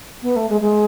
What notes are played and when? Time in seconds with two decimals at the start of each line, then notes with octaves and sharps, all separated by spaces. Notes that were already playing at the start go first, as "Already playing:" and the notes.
0.22 B3
0.36 A3
0.49 G#3
0.61 G#3